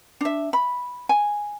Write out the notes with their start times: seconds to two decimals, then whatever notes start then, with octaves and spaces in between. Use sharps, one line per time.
0.21 D4 E5
0.53 B5
1.09 G#5